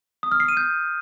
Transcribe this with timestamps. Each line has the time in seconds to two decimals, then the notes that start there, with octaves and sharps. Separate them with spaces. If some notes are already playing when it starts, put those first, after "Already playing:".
0.23 D#6
0.32 F6
0.40 C7
0.48 D#7
0.57 G6